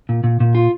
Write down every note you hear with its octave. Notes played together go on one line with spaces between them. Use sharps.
A#2
A#2
A#2
F4